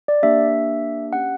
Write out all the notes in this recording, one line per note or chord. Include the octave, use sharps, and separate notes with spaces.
D5
A#3 D4 G4 E5
C#4 G4 F#5